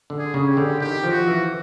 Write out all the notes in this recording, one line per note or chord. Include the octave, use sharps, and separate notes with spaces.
D3
G#4
C#3
G4
D3
D#3 G4
F3
F#4
E3